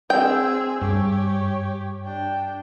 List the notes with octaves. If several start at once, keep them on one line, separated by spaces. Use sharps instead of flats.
C4 G#4 G5 E6
G2 G4 C#5
D4 G5